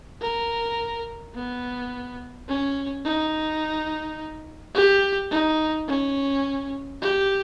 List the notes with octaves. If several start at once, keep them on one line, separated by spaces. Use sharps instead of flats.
A#4
B3
C#4
D#4
G4
D#4
C#4
G4